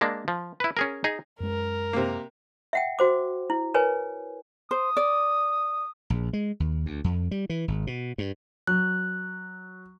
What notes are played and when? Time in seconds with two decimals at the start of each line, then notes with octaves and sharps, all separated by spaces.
0.01 G#3 A#3 D4
0.28 F3
0.60 E4 B4
0.77 C#4 G#4 A#4
1.04 D#4 G#4
1.40 F#2 G#3 A#4
1.93 C3 A#3
2.73 E5 F#5 G5
2.99 F#4 C5 D6
3.50 E4
3.74 A#4 B4 C#5 G#5
4.71 C5 D#6
4.97 D5
6.10 A#1
6.33 G#3
6.60 D#2
6.86 D2
7.04 F2
7.31 G3
7.50 E3
7.68 G#1
7.87 B2
8.18 G2
8.67 F#3 F#6